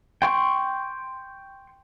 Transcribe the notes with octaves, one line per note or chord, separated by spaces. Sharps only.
G5 C6 C#6